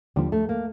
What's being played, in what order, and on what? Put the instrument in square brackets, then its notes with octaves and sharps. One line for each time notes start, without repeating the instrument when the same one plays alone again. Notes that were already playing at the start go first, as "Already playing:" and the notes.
[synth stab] D#2 D3 F3 [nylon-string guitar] G3
[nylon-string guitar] A3
A#3